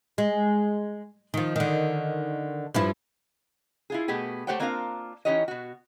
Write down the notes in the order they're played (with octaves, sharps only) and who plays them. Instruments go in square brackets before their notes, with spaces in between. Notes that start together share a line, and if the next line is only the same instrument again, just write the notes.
[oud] G#3
D#3 F3
D3 D#3
G2 F3 E4
[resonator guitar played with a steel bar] E4 F4 G#4
B2 A3 B3 G4 G#4
A3 G4 C5 C#5 F#5 G5
A#3 C4 D4 F4 A#4 F5
E3 C#4 D#4 G4 C#5 D#5
B2 F#4